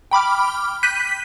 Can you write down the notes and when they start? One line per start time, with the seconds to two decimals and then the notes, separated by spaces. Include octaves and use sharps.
0.11 G5 B5 D6 F6
0.83 F#6 G6 B6 D#7